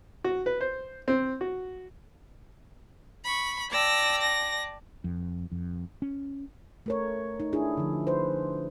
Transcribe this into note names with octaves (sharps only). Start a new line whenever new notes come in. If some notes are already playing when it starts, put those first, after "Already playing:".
F#4
B4
C5
C4
F#4
B5 C#6
D5 G5 A5 E6 A#6
A#6
F2
F2
C#4
A3 A#4 C#5
D#4
D4 E4 G#4
D3 F3
B4 C5